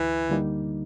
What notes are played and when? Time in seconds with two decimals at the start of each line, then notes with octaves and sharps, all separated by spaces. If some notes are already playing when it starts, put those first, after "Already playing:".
Already playing: D2 E3
0.29 D3 G3 A#3 D#4